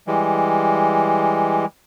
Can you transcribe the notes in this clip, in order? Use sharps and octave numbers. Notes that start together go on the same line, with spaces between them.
E3 G3 G#3